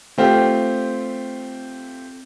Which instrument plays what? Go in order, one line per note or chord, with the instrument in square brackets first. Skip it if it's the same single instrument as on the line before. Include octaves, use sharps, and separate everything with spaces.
[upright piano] A3 C4 F4 G4